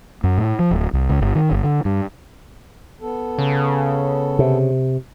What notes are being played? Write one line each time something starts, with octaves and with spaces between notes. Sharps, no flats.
F#2
A2
F3
D1
C2
C#2
G1
D#3
G1
D3
G2
B3 A4
C#3
C3